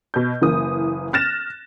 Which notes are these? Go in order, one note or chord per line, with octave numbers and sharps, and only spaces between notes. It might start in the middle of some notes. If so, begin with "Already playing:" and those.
B2 G6
F#1 E3 A#3 D#6
F6 F#6 A6 A#6 E7